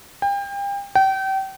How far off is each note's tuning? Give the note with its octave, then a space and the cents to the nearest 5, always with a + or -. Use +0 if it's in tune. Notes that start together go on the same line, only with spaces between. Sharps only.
G5 +35
G5 -30